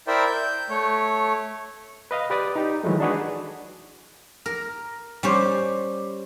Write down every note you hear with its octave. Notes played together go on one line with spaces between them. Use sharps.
E4 A#4 C5 D5 E5 G5
G6
A3 C#5
B4 D#5 F5
G4 B4 D5 D#6
D#4 G4
D#3 E3 F#3 G#3 A3
D4 D#4 F#4 G#4 B4
A#4
G3 C#4 C5